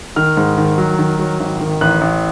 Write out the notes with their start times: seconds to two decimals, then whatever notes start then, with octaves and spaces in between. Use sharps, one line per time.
0.16 D#3 F6
0.37 G#2
0.58 D#3
0.78 F#3
0.99 D#3
1.19 F#3
1.40 G#1
1.60 D#3
1.81 A1 F#6
2.01 A1